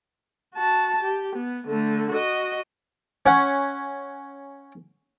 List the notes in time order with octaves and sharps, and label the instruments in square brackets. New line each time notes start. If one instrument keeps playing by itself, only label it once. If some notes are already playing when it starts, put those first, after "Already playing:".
[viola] F#4 A5
G4
B3
D3 A3
F#4 D#5
[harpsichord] C#4 F#5